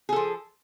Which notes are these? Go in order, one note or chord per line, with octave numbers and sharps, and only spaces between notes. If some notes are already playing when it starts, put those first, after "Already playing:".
F3 G#4 A4